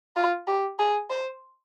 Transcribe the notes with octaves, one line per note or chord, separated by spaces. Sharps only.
F4
G4
G#4
C5